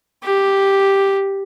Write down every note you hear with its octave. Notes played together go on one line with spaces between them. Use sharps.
G4